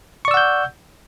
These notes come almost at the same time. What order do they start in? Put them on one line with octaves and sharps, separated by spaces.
C#6 D5 E6 F#5 G6